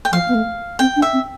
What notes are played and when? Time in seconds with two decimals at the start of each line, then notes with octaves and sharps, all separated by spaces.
0.05 G5
0.12 F3 F5
0.28 B3
0.35 A3
0.79 C4 G5
0.96 D4
1.02 E5
1.13 C4